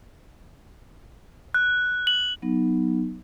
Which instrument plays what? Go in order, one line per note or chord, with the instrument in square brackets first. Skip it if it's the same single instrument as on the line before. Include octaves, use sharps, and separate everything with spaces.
[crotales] F#6
F#7
[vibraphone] F#3 B3 D#4